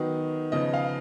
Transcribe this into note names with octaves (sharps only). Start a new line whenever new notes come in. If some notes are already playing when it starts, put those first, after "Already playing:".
Already playing: D#3 F#3 B3 D#4
C#3 F3 B3 D#4 D#5
F5